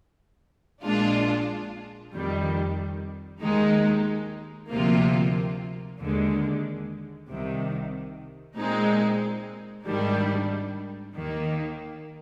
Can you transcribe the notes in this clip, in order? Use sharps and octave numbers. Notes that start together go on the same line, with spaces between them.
A#1 A#2 G#3 D4 F4
F2 D#3 G3
D#2 D#3 G#3 D#4
D2 C3 F3 A#3 F4
D#2 D3 G#3
C2 C3 D#3
A#2 G#3 C4 D#4
G#1 G#2 D#3 G3 D4
D#2 D#3 A#3